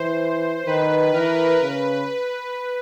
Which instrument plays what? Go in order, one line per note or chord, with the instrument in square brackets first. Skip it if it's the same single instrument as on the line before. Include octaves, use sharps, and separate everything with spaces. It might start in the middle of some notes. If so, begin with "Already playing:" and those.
Already playing: [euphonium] E3 [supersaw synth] C5
[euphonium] D#3 [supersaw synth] B4
[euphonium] E3 [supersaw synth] A#4
[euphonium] C#3 [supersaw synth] B4